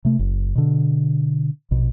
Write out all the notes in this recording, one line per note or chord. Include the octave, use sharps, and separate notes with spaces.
C3 A3
F#1
B2 D3
A#1 B2